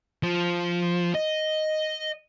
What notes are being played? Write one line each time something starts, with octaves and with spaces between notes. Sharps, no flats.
F3
D#5